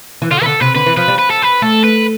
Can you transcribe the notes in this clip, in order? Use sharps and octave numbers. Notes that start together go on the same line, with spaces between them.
E3
D3 F4
E3 B4
D3 A4
C3 B4
D3 B4
E3
F3 B4
G3
B4
A4
B4
A3 A4
B4